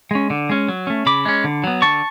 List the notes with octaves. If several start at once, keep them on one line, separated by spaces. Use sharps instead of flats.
G#3 C#4
D3
G#3 C#4
F#3
A3 C#4
C#3 B5 D6
G#3 C#4
D3
F#3 B3
D3 A5 C#6